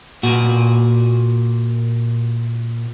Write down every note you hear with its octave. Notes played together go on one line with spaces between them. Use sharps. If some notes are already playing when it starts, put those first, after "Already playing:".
A#2 F#4